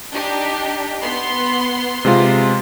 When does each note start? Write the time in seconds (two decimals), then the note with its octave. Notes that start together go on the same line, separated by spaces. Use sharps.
0.11 D4 D#4 G4
1.01 B3 C6
2.05 C3 G#3 F4